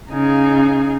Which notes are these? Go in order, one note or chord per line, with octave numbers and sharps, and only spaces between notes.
C#3 D#4 G#4 F5